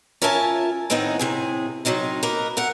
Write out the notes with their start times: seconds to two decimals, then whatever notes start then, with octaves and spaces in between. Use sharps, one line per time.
0.22 C#4 F4 A#4 E5 G#5 A5
0.90 A2 D#3 B3 C4 D#4 G#4
1.19 A2 C3 G#4
1.85 C3 D#3 F#3 D#4 A#4
2.23 A#3 D#4 A#4 B4
2.57 A3 A#4 F#5